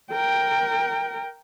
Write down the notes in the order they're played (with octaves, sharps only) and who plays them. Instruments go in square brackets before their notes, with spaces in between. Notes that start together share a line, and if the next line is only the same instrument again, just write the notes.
[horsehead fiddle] A#4 G5